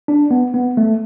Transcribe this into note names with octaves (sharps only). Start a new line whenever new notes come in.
D4
B3
B3
A3